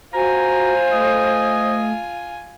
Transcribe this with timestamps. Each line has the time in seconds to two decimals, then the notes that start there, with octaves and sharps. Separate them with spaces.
0.14 F4 F#4 C5 G#5 A#5
0.92 A3 D#5